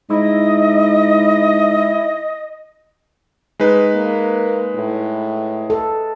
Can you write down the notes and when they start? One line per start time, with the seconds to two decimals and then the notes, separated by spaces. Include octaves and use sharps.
0.10 G#2 E4 D#5
3.60 G#3 D#4 B4
3.94 A#3
4.75 A2
5.70 A4